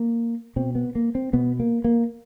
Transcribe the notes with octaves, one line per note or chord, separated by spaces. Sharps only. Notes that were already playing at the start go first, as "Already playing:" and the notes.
Already playing: A#3
B2 C4
B3
A#3
C4
B2 B3
A#3
A#3